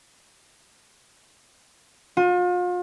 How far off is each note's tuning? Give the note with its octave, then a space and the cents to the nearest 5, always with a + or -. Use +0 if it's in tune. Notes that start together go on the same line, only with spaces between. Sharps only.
F4 +40